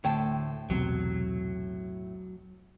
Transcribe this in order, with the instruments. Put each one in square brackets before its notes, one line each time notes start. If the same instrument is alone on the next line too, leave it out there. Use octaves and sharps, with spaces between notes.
[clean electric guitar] D2 [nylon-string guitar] A2 G5 A5
[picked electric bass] B1 E2 C3 [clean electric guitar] F#3